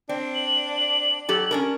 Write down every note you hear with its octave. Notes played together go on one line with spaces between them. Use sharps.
C4 D4
F#7
F#3 G4 A4
C#4 D4 A#4